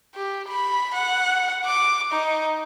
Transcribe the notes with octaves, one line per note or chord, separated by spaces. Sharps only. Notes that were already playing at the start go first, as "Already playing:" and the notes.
G4
B5
F#5
D6
D#4